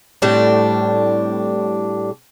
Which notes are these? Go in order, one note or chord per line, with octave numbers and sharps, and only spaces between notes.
A2 G3 C4 D4